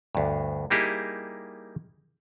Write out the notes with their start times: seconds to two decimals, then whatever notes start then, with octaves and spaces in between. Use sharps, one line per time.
0.15 D2 G2
0.70 G3 A#3 D#4 E4 G4 G#4